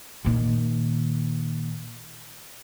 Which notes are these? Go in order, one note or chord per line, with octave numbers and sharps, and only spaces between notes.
A#2 D#3